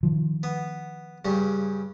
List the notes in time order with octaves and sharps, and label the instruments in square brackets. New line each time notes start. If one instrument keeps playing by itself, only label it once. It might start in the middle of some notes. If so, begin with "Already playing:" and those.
[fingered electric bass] D#3 F3
[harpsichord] B3
G2 C#3 G3